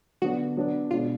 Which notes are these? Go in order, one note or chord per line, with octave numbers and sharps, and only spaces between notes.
D3 F#3 B3 D4 F#4
F#3 B3 D4
B2 G#3 D4 F4